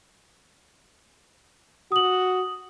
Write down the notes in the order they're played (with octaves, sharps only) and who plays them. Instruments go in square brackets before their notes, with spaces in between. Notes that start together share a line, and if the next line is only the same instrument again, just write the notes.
[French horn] F#4 [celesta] D#6 F#7